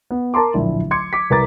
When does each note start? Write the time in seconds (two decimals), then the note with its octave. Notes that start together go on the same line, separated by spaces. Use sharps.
0.11 B3
0.34 A#4 A5 A#5 C6 D6
0.54 D1 A#1 E4
0.91 C6 D6 G#6 C#7
1.13 D6 B6
1.30 C2 A#4 B4 A#5 D6 A6